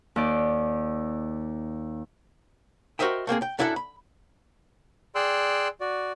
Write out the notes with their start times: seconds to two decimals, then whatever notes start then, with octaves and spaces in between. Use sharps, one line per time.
0.16 D#2 D5
2.99 F#4 A#4 C5 D#5 E5 G5
3.27 A3 A#3 C4 G#4
3.42 G5
3.59 F#2 D4 E4 A4 F#5
3.76 B5
5.15 G#4 D5 G5 C6 E6 F#6
5.81 F#4 D5